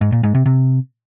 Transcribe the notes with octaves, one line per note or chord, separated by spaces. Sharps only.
G#2
A#2
G#2
C3
C3